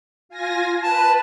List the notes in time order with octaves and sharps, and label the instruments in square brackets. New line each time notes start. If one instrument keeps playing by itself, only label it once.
[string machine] F4 G#5 A#6
[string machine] B4 [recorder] A5